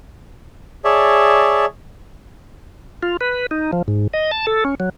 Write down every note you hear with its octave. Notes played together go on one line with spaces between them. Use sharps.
G#4 C#5 D5 E5 A5
F4
B4
D#4
F3
G#2
D#5
A5
A4
C#4
F#3